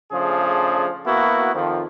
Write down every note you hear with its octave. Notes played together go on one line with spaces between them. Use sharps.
C#3 F3 A3 D4 G#4
A#3 B3 E4 F#4
F2 D#3 F3